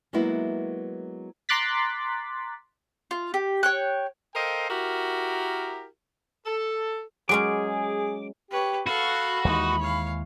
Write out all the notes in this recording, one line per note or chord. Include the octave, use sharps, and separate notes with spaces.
F#3 G#3 A#3 B3 E4
A#5 C6 D6 F#6 A6 B6
F4
G4
C#5 G5 F#6
A4 A#4 C5 D#5 F5 G5
E4 F#4 G4 A#4
A4
F#3 G#3 C#4 G#4 D6
G4 B4 C#5
F#4 A4 F5 B5
D#2 E3 G#3 D#4
C#5 F5